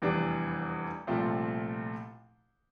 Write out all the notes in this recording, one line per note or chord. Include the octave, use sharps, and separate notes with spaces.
F1 E2 E3 G3 D4
C2 A#2 F3 A3 C4